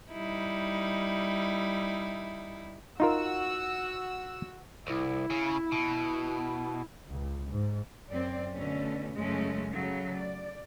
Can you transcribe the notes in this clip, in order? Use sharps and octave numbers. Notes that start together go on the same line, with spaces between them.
G3 D#4 E4
D#4 F4 F#4 A#4 E6
C2 E4
C#3
B2
C#2
G#2
F#2 C4 D5
B2 D3 A3 C#4
F#2 C#3 G#3 A3 C#4
C#3 F#3 A3
D5